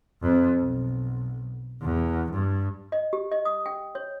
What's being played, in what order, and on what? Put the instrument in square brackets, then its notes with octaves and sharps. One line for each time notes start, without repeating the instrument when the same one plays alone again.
[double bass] F2
B1
E2
G2
[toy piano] D#5
G4
D#5
D#6
G5
C#5